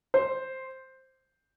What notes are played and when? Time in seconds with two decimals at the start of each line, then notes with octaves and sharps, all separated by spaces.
0.14 C5